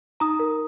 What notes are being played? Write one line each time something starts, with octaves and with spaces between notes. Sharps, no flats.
D#4 A#5 D#6
A#4